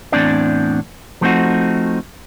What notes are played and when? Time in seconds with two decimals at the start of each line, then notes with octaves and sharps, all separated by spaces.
0.12 E2 A2 C4 D4 D5
1.21 F3 A3 B3 C4 D#4 F#4